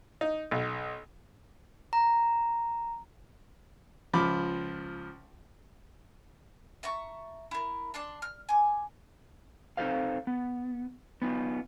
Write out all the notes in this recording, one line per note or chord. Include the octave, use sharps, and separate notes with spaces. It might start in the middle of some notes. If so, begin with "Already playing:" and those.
D#4
B1
A#5
C#2 F3 B5 D6
E5 A5 A#5 C#6
E4 A#4
D4 A5 C6 D6
F6
G#5 D6
C4 D#4 E4 A4 C5 F5
B3
B3 D#4 F4